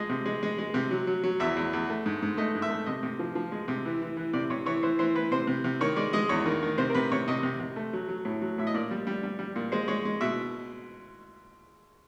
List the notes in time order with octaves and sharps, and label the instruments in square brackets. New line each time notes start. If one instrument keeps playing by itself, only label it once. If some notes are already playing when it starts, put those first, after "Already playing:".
Already playing: [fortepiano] F3 G#3 D#5
C3
G#3
G#3
G#3
C3
F#3
F#3
F#3
E2 E5
E2
E2
A3
G#2
G#2
A3 D#5
G#2
E5
A3
C3 D#5
C3
F3
F3
G#3
C3
E3
E3
E3
C3 D5
C3 C#5
E3 C#5
E3 C5
E3 C5
E3 B4
C3 C5
C3
C3
D#3 C#5
G#3 D5
G#3 D#5
E2 C#5
D#3
D#3
C3 C5
A#4
C3 B4
C3 C#5
C3 D#5
C3
C3
A3
F#3
F#3
A2
F#3
A2 E5
D#5
A#2 D5
G3
G3
G3
G3
A#2
G#3 C5
G#3 C#5
G#3
B2 E5